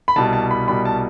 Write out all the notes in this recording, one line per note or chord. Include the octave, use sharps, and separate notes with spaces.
B5
C2 B2 G3 A5
A5
B5
C2 B2 G3 B5
A5